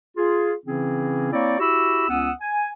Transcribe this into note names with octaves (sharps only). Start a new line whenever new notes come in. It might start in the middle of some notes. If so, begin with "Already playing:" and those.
F4 G#4
C#3 E3 C4 C#4 E4 G#4
A#3 C4 E4 C#5 D5
E4 F#4 G4 B5 E6
C#2 B3 C#4 F#5 D#6 E6
G#5